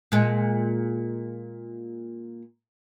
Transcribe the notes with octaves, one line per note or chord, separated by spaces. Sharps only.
A#2 G#3